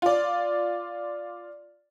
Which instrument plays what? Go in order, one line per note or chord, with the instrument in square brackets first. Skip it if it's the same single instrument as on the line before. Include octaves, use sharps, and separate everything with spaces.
[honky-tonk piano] F4 D5